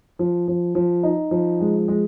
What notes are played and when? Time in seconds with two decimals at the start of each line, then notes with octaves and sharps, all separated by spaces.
0.19 F3
0.48 F3
0.75 F3
1.03 D#4
1.31 F3
1.60 G#3
1.88 G#3